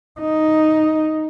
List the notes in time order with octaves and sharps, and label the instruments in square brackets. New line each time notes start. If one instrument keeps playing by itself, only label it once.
[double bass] D#4